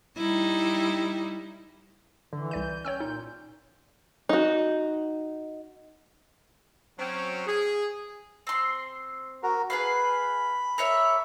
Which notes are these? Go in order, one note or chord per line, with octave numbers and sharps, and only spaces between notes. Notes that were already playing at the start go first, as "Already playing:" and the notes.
G3 D#4 E4
D3 E3
C2 D5 G6 D#7
C#4 C#5 G5 E6
A#2 D#4
D#4 F#4
F#3 C4 C#4
G#4
C4 C6
F#4 A#4
G#4 B4 F5 B5
A#4 C#5 E5